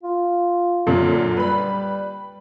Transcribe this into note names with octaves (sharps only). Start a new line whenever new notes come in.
F4
F#2 A#2 D3
G3 B4 B5